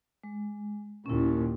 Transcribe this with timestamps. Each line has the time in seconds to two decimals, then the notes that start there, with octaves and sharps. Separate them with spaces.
0.24 G#3
1.06 D#2 A#2 C#4 E4